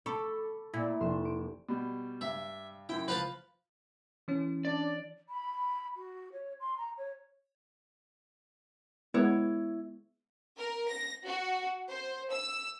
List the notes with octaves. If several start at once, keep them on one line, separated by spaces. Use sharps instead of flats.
A4 B5 C#6 D6
A#2 E4
F1 C6 E7
D7
B2 G3
G2 E5
F#2 E4 G5
F3 B4 F5 A5
E3 C#4
D4 D5
B5
F#4
C#5
C6
A#5
C#5
G#3 B3 E4 C#5
A#4
A#6
F#4
C5
E6